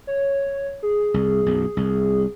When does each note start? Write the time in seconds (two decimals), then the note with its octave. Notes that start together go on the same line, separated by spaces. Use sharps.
0.07 C#5
0.83 G#4
1.14 C2
1.46 B1 F#2
1.77 C2